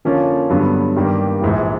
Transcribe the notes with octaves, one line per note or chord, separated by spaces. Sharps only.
D3 F3 A#3 C#4 F4
G2 D3 F#3 B3
G2 D#3 G3 A#3
A#1 G#2 E3